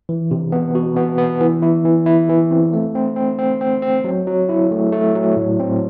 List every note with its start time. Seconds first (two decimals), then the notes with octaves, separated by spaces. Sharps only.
0.09 E3
0.31 C3
0.52 B3
0.75 F#4
0.97 B3
1.18 B3
1.41 E3
1.62 E4
1.85 E3
2.06 E4
2.29 E3
2.51 C4
2.73 A3
2.95 C4
3.16 C4
3.39 C4
3.61 C4
3.82 C4
4.04 F#3
4.27 F#3
4.49 E4
4.71 A3
4.92 A3
5.15 F#3
5.37 A2
5.60 C4